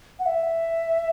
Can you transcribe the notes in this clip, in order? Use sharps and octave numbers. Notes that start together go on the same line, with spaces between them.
F#5
E5